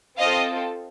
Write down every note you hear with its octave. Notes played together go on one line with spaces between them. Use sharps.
C4 F4 A4 D#5 F5